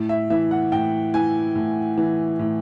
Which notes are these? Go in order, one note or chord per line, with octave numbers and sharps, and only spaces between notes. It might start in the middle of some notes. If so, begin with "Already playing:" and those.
Already playing: A2
E5
E3 E5
F#5
A2 G5
E3 G#5
A2
E3
A2